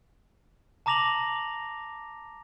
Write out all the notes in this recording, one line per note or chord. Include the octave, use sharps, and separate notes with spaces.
A5 A#5 D6 A#6 F7 F#7